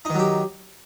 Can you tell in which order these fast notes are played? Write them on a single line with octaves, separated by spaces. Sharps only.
D#4 D#3 F#3 G4